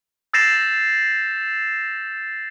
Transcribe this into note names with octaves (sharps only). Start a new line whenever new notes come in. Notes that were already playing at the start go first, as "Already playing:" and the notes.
E6 G6 A6 A#6 C7 E7